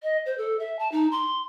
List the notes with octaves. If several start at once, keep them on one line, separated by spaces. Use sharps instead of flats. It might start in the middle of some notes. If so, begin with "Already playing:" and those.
D#5
C5
A4
E5
A5
D#4
C6